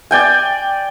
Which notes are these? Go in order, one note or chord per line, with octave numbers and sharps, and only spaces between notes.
D5 G5 G#5